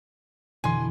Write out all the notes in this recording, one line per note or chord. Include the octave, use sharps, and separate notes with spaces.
F1 B2 D3 E3 G#5 C6